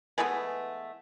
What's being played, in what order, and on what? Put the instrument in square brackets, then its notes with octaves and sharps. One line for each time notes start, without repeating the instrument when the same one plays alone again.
[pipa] E3 G#3 A3 B3